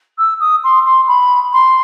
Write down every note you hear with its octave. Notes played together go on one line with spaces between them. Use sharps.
E6
D#6
C6
C6
B5
C6